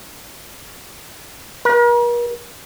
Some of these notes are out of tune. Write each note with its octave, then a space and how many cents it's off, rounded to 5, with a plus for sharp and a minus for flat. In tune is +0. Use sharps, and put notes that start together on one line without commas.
A#4 +45